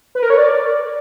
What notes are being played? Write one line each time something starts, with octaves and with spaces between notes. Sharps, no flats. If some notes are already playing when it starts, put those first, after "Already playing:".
B4
A#4
C#5
D5